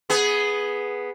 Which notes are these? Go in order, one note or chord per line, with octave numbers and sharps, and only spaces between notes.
B3 G#4